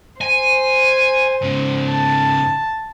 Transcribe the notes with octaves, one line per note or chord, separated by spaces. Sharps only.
C5 G#5
G#2 C#3
A5